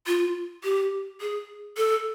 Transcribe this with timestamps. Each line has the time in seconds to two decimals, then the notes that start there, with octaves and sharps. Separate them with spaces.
0.07 F4
0.64 G4
1.21 G#4
1.77 A4